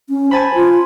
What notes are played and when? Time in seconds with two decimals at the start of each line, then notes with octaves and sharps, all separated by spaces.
0.09 C#4
0.31 C5 G#5 A5 B5
0.55 F4